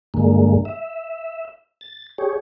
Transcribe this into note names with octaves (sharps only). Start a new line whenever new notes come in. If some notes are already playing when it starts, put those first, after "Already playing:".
G2 D3 G#3 A#3
E5
A6
G4 G#4 C#5